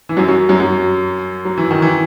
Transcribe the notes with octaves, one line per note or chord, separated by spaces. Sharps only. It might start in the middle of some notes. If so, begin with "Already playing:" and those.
E3
F#2 F#3
F#2 F#3
F#2 F#3
F#2 F#3
F#3
E3
D#3
E3